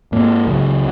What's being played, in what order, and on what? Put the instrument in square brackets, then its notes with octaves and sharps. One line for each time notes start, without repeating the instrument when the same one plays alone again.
[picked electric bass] G#2 A#3
C#2 F#3